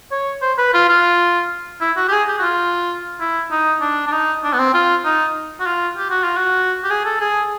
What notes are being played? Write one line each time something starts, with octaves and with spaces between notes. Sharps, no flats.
C#5
C5
B4
F4
F4
E4
F#4
G4
G#4
G4
F#4
F4
E4
D#4
D4
D4
D#4
D4
B3
C4
F4
D#4
F#4
F4
G4
F#4
F4
F#4
G4
G#4
A4
G#4